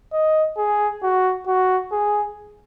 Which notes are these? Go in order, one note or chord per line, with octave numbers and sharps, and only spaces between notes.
D#5
G#4
F#4
F#4
G#4